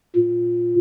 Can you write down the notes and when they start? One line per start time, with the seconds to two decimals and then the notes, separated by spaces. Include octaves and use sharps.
0.16 A#2